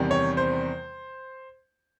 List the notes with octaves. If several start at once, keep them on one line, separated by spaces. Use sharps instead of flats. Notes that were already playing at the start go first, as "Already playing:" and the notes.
Already playing: E2 C3 D#3 G3
C#5
C5